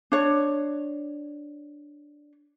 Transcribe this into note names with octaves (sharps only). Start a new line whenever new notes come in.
D4 C#5